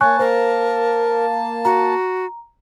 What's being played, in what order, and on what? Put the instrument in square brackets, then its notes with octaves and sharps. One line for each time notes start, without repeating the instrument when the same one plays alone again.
[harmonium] A#3 A5 [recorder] C#5 [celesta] G#5 C#6 F#6
[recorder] A#4 [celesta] C5
[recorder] F#4 [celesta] A#5